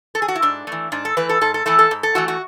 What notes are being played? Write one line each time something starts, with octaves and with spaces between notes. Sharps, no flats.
A4
G#4
F#4
E4
G#2 D4
E3 A3
G#2 D4
A4
E3 A3 B4
A4
G#2 A4
A4
E3 A3 A4
A4
G#2
A4
E3 A3 F#4
F#4